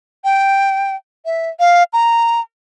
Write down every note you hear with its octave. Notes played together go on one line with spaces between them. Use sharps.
G5
E5
F5
A#5